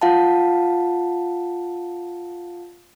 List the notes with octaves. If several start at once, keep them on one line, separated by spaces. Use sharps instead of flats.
F4 F5 F#5 A5